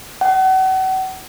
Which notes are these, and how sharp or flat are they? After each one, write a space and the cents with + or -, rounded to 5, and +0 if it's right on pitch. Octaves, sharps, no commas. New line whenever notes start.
F#5 +35